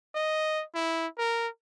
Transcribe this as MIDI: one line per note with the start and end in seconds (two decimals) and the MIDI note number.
0.15 0.64 75
0.75 1.07 64
1.18 1.48 70